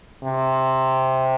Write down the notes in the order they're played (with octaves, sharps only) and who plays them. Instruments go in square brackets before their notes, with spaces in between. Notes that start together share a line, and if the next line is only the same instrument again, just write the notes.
[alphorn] C3